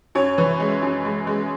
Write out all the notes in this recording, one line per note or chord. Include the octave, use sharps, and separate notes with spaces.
F#2 C#5
E3
G#3
F#2
G#3
G#3